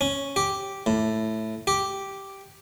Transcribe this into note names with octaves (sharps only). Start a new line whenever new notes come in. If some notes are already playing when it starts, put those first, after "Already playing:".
C#4
G4
A2
G4